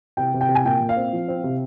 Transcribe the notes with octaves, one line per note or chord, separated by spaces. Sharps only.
C3 G5
C3
G5
C3
G#5
A#2 G5
A#2
F5
C4
F3
C4
C3